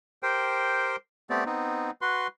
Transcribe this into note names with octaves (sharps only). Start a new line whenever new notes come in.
G4 A#4 C5 G5
A3 B3 C4 G4 D5
B3 C4 D#4
F#4 B4 C6